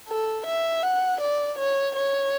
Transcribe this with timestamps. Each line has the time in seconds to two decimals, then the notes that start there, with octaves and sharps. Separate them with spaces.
0.08 A4
0.46 E5
0.83 F#5
1.21 D5
1.59 C#5
1.96 C#5